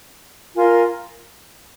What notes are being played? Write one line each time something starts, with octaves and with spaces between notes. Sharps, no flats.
F4 A#4 G#5 C6